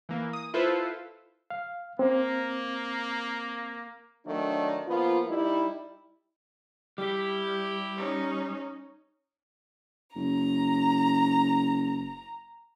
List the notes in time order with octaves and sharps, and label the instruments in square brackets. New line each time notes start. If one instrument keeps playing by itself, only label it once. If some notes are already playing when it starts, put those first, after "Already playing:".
[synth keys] E3 A#3
D#6
E4 F4 A4 B4 C5 E5
[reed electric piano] F5
[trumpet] A#3 [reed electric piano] C4
[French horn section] D#3 F#3 A3 D4
F3 A#3 B3 F4
G3 D#4 E4
[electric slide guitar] G3 [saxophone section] E4 G4
[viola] C#4 D#4
[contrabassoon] F#1 [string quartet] A#5